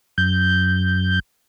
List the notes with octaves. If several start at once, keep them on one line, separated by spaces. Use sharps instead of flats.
F#2 G6